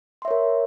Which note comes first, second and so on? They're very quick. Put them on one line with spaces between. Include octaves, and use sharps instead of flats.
C6 E5 C#5 A#4